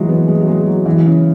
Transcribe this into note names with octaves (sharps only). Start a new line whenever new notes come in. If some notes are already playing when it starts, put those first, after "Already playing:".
Already playing: E3 F#3 G#3
B3
G#3
F#3
G#3
F#3
E3
C#3